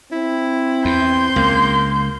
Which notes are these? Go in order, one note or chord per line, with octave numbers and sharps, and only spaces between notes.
C4 E4
E2 C6 G6
C#2 A#3